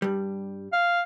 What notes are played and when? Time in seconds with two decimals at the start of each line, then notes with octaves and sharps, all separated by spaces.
0.02 G2 G3
0.73 F5